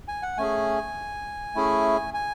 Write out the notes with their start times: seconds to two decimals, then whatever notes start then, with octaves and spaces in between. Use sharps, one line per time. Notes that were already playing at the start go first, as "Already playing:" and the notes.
0.08 G#5
0.22 F#5
0.38 A3 C#4 G#4 G#5
1.55 A3 C#4 E4 G#4
2.14 G#5